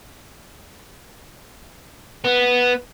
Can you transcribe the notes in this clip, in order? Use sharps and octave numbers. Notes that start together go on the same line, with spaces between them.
B3